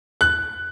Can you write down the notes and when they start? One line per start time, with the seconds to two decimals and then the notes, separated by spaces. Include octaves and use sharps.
0.21 F#6